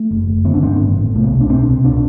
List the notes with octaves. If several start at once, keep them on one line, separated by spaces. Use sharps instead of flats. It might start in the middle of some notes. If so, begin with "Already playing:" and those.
Already playing: A3
F#1
F#1
D3 B3
D4
G2 C4
B3
A1
A1
C2 A3
B3
B2
D4
B2 C4
C2
C4
B2 D4